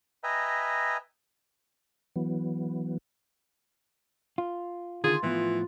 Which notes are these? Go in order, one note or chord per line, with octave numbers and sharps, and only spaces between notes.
B4 D#5 E5 G5 G#5 A#5
E3 F#3 B3
F4
D3 D#3 F4 G#4
A2 E3 F3 B3